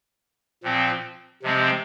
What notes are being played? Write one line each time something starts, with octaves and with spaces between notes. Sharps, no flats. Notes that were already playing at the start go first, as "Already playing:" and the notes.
A#2 F3 C4
C3 F3 G#3 C4